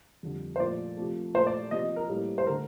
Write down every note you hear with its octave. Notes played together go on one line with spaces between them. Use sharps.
F2 D3 G3
C5
A#2 F3 A3 D5
C3 F3 A3
A#2 A3 C5
D5
C3 F3 A#3 D#5
A#4
A2 G3 A#3
C5
D3 A3 A#4